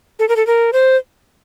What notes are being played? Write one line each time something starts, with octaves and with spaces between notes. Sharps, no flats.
A4
A#4
A4
A#4
C5